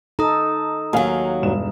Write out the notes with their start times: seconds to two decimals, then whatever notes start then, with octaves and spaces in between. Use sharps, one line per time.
0.19 D#4 A4 A#5 D#6
0.93 D#2 F#3 F5 G#5
1.42 E1 G2 E7